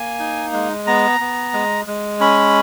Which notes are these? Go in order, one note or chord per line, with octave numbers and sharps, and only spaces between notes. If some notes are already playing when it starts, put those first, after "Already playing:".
Already playing: A#3 G#5
D#4
G#3
B3 A#5
B3
G#3
G#3
C#4 B5